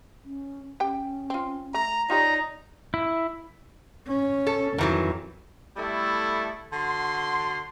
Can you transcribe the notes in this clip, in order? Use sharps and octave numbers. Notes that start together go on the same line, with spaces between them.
C#4
C#4 G4 G5
C4 F4
A3 A#5
D#4 F4 G4 C#5 D5 A#5
E4
C#4
A4
F2 D#3 E3 F#3
G3 A3 B3 E4 A4
D3 F#4 C6